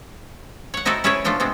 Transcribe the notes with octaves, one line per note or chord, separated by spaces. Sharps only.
C#5 F#5
C4 D#4 E4 F#4 A4
C#4 E4 G#4 A4 B4 C#5
B2 F3 A3 D4 F4 A4
C3 G#3 B3 C4